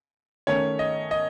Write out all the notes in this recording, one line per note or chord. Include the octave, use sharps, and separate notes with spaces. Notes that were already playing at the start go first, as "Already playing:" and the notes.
D#3 A3 C#4 C#5
D#5
D#5